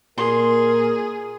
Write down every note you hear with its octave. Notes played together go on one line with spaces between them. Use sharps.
A#2 G#4 A#4 C6